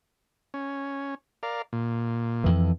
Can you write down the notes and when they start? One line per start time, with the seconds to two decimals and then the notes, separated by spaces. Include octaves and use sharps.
0.54 C#4
1.43 A#4 D5 F5
1.73 A#2
2.44 F2 E3